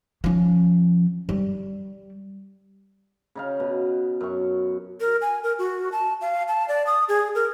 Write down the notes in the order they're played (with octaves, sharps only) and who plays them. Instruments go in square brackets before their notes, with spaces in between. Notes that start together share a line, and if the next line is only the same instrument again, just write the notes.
[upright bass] F3 C#4
G3
[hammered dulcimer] C#3 D#4 F5
B2
F#2 C#6
[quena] A#4
G#5
A#4
F#4
A5
F5
A5
D5
D#6
G#4
A#4